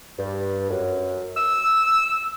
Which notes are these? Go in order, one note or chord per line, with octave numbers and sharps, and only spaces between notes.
G2
F#2
E6